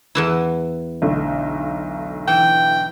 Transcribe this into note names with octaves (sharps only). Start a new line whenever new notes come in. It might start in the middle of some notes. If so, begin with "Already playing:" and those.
E2 E3 E4
B1 D3 A3
E3 G5